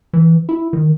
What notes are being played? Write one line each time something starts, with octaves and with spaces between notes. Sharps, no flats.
E3
E4
D#3